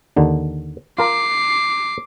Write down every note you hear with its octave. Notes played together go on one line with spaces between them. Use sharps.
D#2 D3 D#3
F4 A#4 A#5 D6 C7